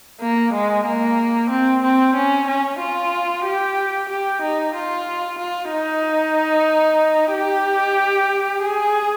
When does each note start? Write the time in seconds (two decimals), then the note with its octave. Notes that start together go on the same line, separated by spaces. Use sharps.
0.21 A#3
0.54 G#3
0.86 A#3
1.50 C4
1.83 C4
2.16 C#4
2.48 C#4
2.80 F4
3.45 G4
4.09 G4
4.42 D#4
4.75 F4
5.39 F4
5.72 D#4
7.33 G4
8.63 G#4